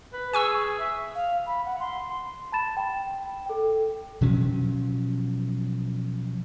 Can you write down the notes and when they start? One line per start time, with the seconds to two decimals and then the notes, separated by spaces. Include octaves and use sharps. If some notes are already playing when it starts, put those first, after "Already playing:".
0.13 B4
0.33 G#4 G#5 C#6 E6
0.79 E5
1.15 F5
1.47 B5
1.65 F#5
1.80 C6
2.52 A5 B5 A6 E7
2.77 G5
3.46 A4 G5
4.21 B2 F3 F#3 C#4